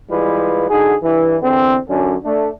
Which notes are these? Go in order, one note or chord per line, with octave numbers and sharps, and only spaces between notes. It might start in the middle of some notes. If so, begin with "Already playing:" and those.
G#2 E3 G3 G#3 F4 B4
D3 D#4 F#4 G#4
G2 E3
E2 D3 C4
F#2 D3 C#4
A3 D4